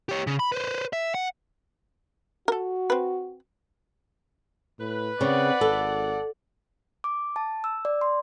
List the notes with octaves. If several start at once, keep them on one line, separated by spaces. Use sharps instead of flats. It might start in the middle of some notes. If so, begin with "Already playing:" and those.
G4 C#5
C#3
B5
B4 C5
E5
F#5
F#4 A4 A#4
C4 B4
A2 B4
C#3 C4 D5 F#5
G#1 A4
D6
A5
E6
D5
C6